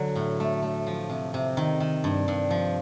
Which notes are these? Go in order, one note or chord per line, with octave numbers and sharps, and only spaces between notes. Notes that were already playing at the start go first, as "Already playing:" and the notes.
Already playing: D3 F#3
A2
A3
A3
F3
C3
C3
D#3
D#3
G2
G2
F3